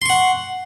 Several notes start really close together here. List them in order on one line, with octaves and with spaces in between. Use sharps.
C6 C#6 F#5